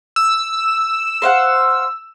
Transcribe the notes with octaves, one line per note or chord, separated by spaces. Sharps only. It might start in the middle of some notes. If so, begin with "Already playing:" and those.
E6
C5 F5 F#5